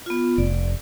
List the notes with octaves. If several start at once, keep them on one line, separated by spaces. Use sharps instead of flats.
B3 F4
F1 D5